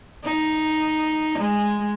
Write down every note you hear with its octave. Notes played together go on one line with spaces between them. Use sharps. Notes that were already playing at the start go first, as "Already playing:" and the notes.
D#4
G#3